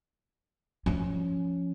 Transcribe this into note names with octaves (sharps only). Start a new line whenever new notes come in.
F3 C#4